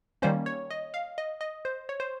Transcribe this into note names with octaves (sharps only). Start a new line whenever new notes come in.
D#3 G3 A#3 C#4 C5
C#5
D#5
F5
D#5
D#5
C5
C#5
C5